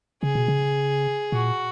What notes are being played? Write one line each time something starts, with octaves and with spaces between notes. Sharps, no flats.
C#3 G#4
B2
C#3
A#2 F#4